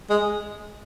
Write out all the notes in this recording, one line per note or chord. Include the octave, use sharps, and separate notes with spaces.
G#3